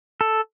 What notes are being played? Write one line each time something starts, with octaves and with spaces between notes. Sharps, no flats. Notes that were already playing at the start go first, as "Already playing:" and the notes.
A4